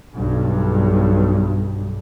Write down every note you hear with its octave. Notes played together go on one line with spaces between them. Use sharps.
B1 G2